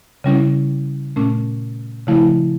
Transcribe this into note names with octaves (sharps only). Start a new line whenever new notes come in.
C#3 G3 C#4 E4
A#2 A3 C#4
C#3 F3 A3 E4